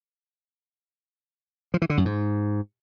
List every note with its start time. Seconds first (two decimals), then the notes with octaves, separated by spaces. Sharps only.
1.74 F3
1.82 E3
1.90 D3
1.97 F#2
2.05 G#2